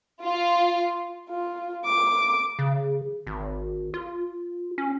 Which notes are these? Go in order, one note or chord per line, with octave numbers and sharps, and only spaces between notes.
F4
F4
D6
C#3
G#1
F4
C#4